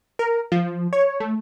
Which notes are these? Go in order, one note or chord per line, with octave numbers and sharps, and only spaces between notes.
A#4
F3
C#5
A3